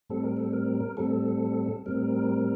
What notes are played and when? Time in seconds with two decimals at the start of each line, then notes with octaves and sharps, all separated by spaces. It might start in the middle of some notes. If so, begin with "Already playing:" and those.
0.10 A2 G3 C4 A4
0.24 A#4
0.37 A4
0.53 A#4
0.97 A2 G3 C4 A4
1.86 A2 G3 C4 A#4